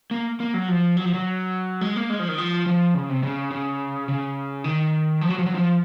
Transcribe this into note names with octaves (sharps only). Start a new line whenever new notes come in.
A#3
A#3
F#3
F3
F#3
F3
F#3
G#3
A#3
G#3
F3
D#3
F3
F3
C#3
C3
C#3
C#3
C#3
D#3
F3
F#3
F3
F#3
F3